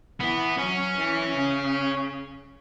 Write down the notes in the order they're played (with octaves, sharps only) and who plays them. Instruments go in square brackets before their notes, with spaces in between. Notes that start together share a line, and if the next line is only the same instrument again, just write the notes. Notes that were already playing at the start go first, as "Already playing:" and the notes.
[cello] E3 [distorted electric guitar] B3
[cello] F#3 [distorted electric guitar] C#4
[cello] E3
C#3